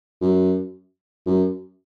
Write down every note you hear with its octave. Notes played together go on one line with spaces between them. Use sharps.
F#2
F#2